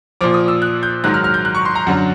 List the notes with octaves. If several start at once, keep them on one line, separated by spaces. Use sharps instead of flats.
A#2 F3 D6
D#6
E6
F#6
G6
G#2 D#3 F#3 F#6
F6
F6
G6
F#6
C#6
C6
A#5
F#2 D3 F#3 F#5